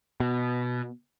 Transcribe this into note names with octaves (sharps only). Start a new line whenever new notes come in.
B2